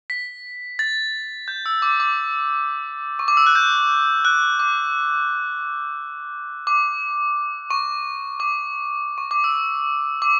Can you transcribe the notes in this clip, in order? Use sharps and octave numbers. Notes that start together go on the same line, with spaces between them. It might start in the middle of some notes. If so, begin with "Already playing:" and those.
B6
A6
G6
E6
D6
D6
C#6
D6
E6
F#6
G6
F#6
D6
D6
C#6
D6
C#6
D6
E6
D6